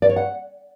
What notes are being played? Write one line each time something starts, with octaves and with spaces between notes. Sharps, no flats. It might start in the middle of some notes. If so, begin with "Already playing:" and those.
D5
C#5
F#5